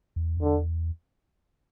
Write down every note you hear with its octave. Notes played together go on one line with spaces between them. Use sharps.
E2
F2
E2 D3